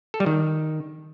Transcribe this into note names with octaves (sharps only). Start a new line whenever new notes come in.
A4
G3
D#3